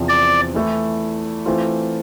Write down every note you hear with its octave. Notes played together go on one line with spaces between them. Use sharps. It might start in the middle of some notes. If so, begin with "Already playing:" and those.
Already playing: E2 C3 F3 C4
D5
E3 A3 E4
E3 A3 C4 F4